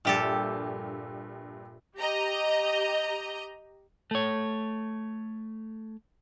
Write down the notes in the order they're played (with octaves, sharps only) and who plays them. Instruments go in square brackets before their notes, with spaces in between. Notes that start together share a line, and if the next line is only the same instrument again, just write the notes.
[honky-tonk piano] A#1 G2 [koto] A#2 G4 A4
[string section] G4 D#5 A#5
[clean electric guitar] A3 C#5